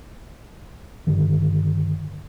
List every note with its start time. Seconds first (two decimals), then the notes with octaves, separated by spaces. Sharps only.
1.07 G2 D3 D#3